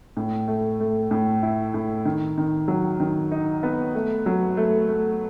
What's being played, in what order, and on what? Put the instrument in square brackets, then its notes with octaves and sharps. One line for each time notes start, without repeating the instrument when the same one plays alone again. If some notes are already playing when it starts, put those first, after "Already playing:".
[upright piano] A2
A3
A3
A2
E4
A2
D#3
D#3
F#3
D#3
D#4
B3
A3
F#3
A3
A3